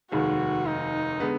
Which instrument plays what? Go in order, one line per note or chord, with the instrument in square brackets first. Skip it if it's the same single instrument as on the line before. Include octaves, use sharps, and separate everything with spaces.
[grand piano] F1 D#2 D#3 G#3 [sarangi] F#4
[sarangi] D#4
[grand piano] D3 G#3 B3